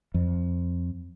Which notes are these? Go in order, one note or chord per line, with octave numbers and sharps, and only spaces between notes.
F2